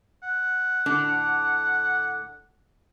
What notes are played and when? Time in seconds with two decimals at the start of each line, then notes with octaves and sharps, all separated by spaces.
0.23 F#5
0.86 A2 D3 D4